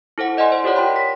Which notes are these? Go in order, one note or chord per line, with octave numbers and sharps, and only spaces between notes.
E4 A4 C5 F#5
D5 D#5 F#5 G#5 C6
C5
F4 G4 A#4 C#5 D5 F#5
F4 G5 B5 C6
A#6 B6